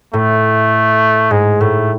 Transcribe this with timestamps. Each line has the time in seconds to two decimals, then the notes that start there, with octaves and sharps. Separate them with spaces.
0.13 A2 A3
1.31 G#2 G#3
1.61 A2 A3